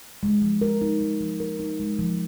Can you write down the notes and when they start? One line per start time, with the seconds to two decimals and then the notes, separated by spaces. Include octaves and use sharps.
0.23 G#3
0.42 F3
0.61 A#4
0.81 D#4
1.01 G#3
1.20 F3
1.40 A#4
1.60 D#4
1.80 G#3
1.99 F3